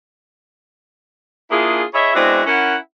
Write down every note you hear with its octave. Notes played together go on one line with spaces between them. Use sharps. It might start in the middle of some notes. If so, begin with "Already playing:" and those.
A#3 D4 E4 F4 G#4
E4 G#4 C#5 D#5 E5
G#3 B3 C4 D4 E4 F#4
C#4 E4 A#4 F#5